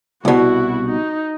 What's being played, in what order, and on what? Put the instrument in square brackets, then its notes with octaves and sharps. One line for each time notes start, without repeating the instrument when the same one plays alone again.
[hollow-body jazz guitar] C2 B2 [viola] E4 F#4
[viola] D#4